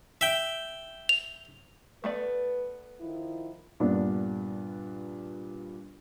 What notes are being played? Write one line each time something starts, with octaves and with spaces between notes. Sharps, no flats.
E5 G5
F7
A3 B3 B4 D5
D#3 F3 E4
G2 A#2 B3 D4